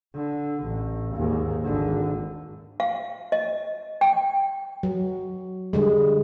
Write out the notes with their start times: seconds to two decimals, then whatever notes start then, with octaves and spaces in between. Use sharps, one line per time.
0.15 D3
0.64 A1
1.15 D#2 G#2
1.64 G#1 D3
2.80 F5
3.32 D#5
4.01 G5
4.83 F#3
5.73 D3 G3 G#3